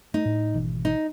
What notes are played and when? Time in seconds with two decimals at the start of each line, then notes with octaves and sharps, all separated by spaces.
0.14 A3 D#4
0.26 A2
0.54 G#1 B2 E3
0.85 D#4